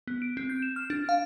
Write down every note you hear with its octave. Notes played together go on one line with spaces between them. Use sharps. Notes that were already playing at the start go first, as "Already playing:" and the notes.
B3
D7
C4
G6
E7
F6
D4
F5